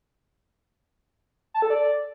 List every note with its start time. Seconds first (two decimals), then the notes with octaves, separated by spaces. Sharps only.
1.54 A5
1.62 A4
1.70 D5